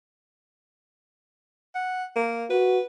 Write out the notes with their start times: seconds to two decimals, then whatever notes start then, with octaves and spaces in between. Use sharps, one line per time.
1.75 F#5
2.16 A#3
2.50 F#4 B4